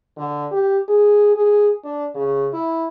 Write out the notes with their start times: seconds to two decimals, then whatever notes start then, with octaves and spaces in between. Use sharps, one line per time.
0.18 D3
0.51 G4
0.88 G#4
1.36 G#4
1.84 D4
2.15 C#3
2.54 E4